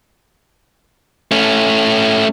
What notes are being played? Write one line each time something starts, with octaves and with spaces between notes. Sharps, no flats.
A3 C#4